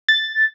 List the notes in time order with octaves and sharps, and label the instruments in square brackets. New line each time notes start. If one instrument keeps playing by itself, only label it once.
[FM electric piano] A6